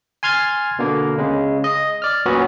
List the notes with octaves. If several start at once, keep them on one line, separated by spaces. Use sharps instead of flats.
G#5 C6 F6 G#6 A6
B2 D3 A#3
C#3 G#3
D#5
D5 F6
A#2 F#3 B3 C#4 F#4